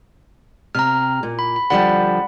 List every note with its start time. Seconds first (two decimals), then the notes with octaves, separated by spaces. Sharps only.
0.75 C3 A#5 F6
1.23 A#2
1.39 B5
1.56 B5
1.70 D3 F3 G3 D5 F#5 B5